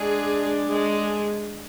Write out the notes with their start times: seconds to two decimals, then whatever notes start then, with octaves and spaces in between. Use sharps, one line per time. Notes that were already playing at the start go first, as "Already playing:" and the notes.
Already playing: G#3 D4 G#4
0.68 G#3 G#4